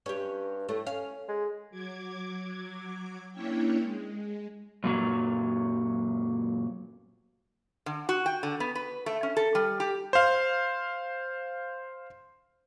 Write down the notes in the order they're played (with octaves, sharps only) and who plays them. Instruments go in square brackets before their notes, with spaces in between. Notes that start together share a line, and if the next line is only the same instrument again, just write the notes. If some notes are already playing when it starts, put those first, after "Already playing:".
[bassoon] G2 [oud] C#4 G4
[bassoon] A2 [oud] A3
[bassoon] C#4 [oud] F5
[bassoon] G#3
[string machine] F#3 D6 G#6
A#3 C#4 D4 E4 C#5 G5
G#3
[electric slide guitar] F#2 A#2 F#3
[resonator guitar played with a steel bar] D3
F#4
G5
D3
B3
B4
A3
C#4
A4
G3
G4
[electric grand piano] C5 F5